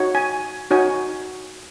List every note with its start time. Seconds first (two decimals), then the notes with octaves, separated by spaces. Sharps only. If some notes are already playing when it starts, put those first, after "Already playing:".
Already playing: D#4 F#4 C#5
0.15 G#5
0.71 D#4 F#4 C#5 G#5